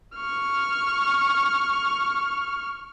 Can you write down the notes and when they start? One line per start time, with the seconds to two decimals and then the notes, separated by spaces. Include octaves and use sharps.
0.17 C#6 F6